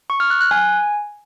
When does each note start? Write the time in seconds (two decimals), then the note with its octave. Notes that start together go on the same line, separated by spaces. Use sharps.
0.10 C#6
0.20 F6
0.30 F#6
0.41 F#6
0.51 G#5